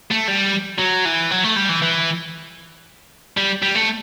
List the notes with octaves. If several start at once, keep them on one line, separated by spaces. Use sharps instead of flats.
A3
G3
F#3
E3
F#3
A3
G3
E3
E3
G3
G3
A3